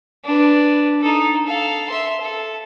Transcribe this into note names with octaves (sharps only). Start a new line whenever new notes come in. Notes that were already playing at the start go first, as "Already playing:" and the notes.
D4 B4
D#4 A4
A4 F5
E5 C6
A4